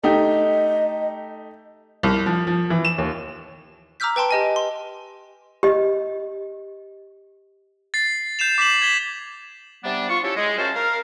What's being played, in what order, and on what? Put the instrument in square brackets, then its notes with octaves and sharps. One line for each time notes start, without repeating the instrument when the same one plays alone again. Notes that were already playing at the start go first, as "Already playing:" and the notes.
[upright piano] A3 D#4 G4 [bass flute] D#5
[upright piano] C2
F3
F3
E3
E7
D#2
[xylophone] A#5 D6 E6 F6 G6 B6
B4 G5 A5 C6 D7
G4 D#5 G#5
C6
[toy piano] G4 D#5
[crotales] A6 C7
G6 C7 E7 F7
D6 B6 C7 E7 F#7
G#6 B6 G7
[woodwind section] C3 G3 B3 D4
F4 C#6
C#4 E4 G4 A4
G#3
F#2 C#4 F#4 C5 F5 A5
A#4 F5